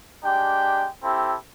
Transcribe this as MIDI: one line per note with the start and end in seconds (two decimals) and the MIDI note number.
0.24 0.87 56
0.24 0.87 62
0.24 0.87 67
0.24 0.87 79
1.02 1.36 60
1.02 1.36 64
1.02 1.36 67
1.02 1.36 69